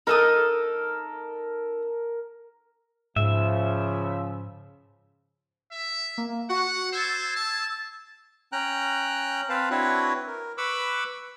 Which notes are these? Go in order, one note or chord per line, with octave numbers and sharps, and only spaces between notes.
D#4 A4 A#4 D#6
G#2 C#3 F3 E5
E5
A#3
F#4 F#5
C5 E6 G#6 A6
A5
C#4 G5 A#5 F#6
C4 B4 C5 F5 A5
C4 D4 E4 F#4 B4 C#5
A#4
B4 B5 C#6 D6 E6